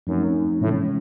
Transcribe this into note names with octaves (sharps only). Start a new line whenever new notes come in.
F#2 F3 A3 C4 D#4
A2 C3 E3 G#3 C#4